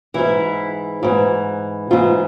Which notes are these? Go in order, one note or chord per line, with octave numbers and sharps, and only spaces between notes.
G#2 E3 E4
G#2 E3
G#2 E3 F4